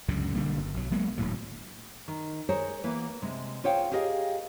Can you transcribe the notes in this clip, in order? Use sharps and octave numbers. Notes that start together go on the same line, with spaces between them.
C#2 F#2 A2 D3
B1 D3 G3 A#3
G1
B1 F#3
F#3 G#3 A#3 B3
D#1 D2 A2 F#3
D#3
G#3 G#4 A#4 C5 C#5
E3 A#3 B3 B4
C3 G#3
F4 G#4 C5 C#5 F5 G5
G4 G#4 A#4 D#5 F5